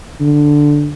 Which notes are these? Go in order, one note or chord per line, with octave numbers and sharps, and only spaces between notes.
D3